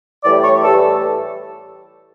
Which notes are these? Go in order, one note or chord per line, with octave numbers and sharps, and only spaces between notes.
A2 E3 G3 D5
C#5
A2 E3 G3 A4